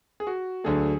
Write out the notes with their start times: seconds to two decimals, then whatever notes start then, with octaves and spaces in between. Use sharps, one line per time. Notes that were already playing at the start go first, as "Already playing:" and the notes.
0.20 G#4
0.27 F#4
0.64 D2 D3 F#3 A3 G#4